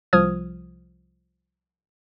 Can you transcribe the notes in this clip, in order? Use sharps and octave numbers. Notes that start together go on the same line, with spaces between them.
C2 F3 D#6 F6 G#6